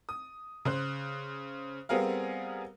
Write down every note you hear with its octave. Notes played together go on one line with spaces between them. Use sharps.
D#6
C#3 C5 F#6
G3 B3 C4 G#4 A#4 F5